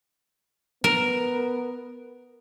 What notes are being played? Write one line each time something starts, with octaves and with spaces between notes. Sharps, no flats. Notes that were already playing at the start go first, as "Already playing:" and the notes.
B3 A#4